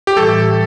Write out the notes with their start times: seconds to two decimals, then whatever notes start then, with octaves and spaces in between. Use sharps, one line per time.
0.07 G4
0.17 A2 E3 G3 A4